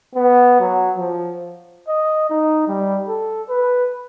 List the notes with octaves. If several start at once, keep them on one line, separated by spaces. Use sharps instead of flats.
B3
F#3
F3
D#5
D#4
G3
A4
B4